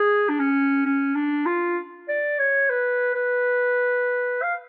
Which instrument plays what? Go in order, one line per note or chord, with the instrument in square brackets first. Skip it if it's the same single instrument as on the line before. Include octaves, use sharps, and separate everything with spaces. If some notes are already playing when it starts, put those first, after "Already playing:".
Already playing: [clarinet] G#4
D4
C#4
C#4
D4
F4
D5
C#5
B4
B4
F5